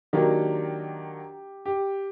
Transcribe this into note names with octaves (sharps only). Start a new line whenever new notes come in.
D#3 F#3 A#3 D4 G4
G4